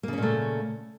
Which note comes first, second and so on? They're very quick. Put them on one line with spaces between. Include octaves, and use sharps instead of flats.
A#3 C#3 C#4 A#2 A3